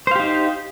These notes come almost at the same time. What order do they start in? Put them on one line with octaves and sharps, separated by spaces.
C5 F5 G4 D#4